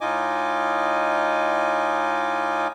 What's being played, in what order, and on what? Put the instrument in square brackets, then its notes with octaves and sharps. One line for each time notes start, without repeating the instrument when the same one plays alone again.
[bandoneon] A2 D#4 F4 D#5 G#5 D6